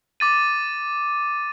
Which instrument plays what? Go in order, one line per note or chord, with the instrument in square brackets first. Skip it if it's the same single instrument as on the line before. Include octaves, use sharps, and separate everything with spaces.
[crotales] D6 A6 D#7